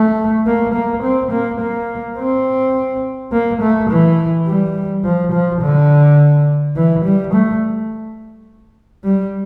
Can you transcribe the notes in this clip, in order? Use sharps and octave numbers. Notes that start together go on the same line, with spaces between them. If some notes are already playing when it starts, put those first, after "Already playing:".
Already playing: A3
A#3
A#3
C4
A#3
A#3
C4
A#3
A3
E3
G3
F3
F3
D3
E3
G3
A3
G3